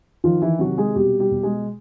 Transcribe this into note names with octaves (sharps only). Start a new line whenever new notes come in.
D#3 F3 F4
E3 E4
C3 F#3 F#4
G#3 G#4
B2 G3 G4
G3 G4
B2
G#3 G#4